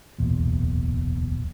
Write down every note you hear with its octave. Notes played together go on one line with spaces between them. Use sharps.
D1 B1 E2 A#2